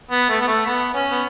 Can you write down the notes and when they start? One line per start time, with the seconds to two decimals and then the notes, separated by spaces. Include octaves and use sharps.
0.11 B3
0.30 A3
0.41 B3
0.48 A3
0.66 B3
0.94 C#4
1.11 B3